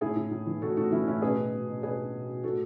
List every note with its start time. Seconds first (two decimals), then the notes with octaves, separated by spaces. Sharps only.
0.01 A2 E4 G#4
0.16 A2
0.31 A2
0.47 E3
0.62 A2 F#4 A4
0.77 A2 F#4 A4
0.92 E3 C#4 E4
1.07 A2 C#4 E4
1.22 B2 G#4 B4
1.38 B2
1.53 B2
1.68 B2
1.83 B2 G#4 B4
1.98 B2
2.13 B2
2.29 B2
2.43 A2 F#4 A4